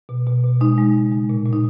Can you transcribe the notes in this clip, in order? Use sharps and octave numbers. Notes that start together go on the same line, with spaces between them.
B2
B2
B2
G#3 D#4
G#3
C#3
G#3
A#2
A#2
D#4